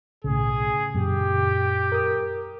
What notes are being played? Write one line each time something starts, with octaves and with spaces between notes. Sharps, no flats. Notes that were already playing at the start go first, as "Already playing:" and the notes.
B1 A2 C#3 G#4
F#2 A#2 G4
A#4 D#6